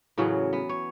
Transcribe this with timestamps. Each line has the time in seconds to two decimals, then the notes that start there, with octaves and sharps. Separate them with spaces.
0.18 A2 C#3 E3 F#3
0.53 B3
0.69 C#5